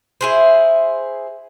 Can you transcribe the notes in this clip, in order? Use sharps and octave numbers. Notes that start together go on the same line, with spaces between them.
E4 G#4 C5